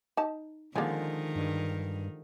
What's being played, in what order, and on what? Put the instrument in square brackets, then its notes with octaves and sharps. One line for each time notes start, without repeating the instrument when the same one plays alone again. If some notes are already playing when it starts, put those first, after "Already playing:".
[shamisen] D#4 A5
[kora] D3 F3 G#3 [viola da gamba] D#3 [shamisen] A#3 C#4
[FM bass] G2